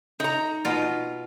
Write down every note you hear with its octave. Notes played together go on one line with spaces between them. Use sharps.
D#4 A#5
B2 F4